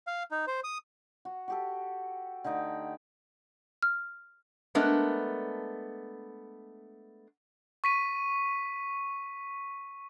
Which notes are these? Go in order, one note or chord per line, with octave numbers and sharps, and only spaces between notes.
F5
D#4
C5
D#6
F#4
F#4 G4 A4
D3 A3 D#4 G5
F6
G#3 A3 B3 D4 A#4
C#6 B6 D#7